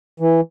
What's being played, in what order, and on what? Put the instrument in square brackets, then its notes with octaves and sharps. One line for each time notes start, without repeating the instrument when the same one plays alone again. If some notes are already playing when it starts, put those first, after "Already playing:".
[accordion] E3